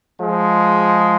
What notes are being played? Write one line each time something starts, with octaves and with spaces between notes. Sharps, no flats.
F3 G#3